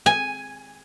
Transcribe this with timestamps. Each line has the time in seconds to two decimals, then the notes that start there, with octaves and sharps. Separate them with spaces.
0.06 G#5